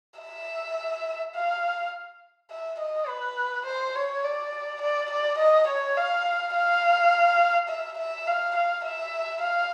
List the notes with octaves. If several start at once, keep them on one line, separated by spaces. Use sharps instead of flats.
E5
F5
E5
D#5
B4
C5
C#5
D5
D5
D5
D#5
C#5
F5
F5
E5
E5
F5
F5
E5
F5